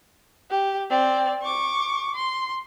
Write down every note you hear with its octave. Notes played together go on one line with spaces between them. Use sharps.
G4
C4 D5
C#6 D6
C6